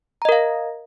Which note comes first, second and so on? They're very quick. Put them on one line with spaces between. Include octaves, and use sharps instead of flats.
A#5 D#5 A#4 F5